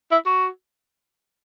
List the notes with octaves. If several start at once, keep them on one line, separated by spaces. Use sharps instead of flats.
E4
F#4